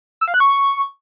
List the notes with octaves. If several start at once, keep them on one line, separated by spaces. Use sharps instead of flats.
E6
F5
F#6
C#6